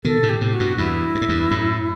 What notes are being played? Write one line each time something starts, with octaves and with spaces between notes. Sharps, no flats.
B2 D#3 A4
A2 C3
G4
A2 C3
F#4
G2 B2
E2 G2 E4
G2
A2
E2 G2
F#2 A2